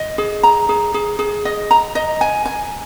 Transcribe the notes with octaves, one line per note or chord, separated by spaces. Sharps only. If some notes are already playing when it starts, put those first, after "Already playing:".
Already playing: D#5
G#4
A#5
G#4
G#4
G#4
D#5
A#5
D#5
G#5
G#5